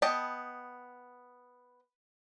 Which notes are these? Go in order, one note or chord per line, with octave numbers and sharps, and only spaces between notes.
B3 D#5 G5 A5